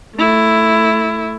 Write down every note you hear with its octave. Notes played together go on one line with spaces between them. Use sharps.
A3 E4